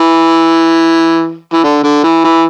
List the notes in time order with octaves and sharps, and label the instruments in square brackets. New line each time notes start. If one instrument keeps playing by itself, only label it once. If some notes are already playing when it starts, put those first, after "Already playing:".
Already playing: [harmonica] E3
E3
D3
D3
E3
E3